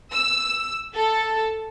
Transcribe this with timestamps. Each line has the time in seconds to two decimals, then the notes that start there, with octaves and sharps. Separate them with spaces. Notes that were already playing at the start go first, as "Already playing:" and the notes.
0.12 E6
0.94 A4